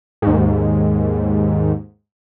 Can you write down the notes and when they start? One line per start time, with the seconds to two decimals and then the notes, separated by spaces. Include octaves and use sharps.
0.22 D#2 G#2